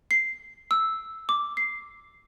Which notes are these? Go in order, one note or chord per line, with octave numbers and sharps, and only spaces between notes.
C7
E6
D6
C7